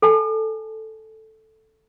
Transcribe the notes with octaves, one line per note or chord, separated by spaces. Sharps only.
A4 G#5 A5